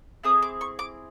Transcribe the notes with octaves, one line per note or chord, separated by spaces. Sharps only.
C4 E4 G#4 D#6
D6
C#6
D6